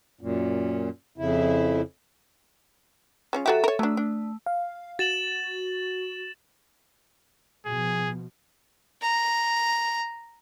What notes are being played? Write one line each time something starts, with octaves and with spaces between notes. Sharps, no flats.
F#2 A#2
F2 C#3 E4
G#3 C#4 F4
F#3 F#4 G4 A4 E5
A#4 C#5
F#3 A3 D4
D4
F5
F#4 A6 E7 F#7
B2 F3 G#4
A#5